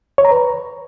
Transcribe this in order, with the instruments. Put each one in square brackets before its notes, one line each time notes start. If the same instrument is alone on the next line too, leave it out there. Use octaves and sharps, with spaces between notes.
[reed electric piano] C#5
A#5
B4